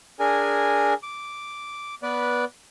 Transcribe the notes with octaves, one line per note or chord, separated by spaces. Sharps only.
D4 G#4 A#4 G#5
D6
B3 B4 D5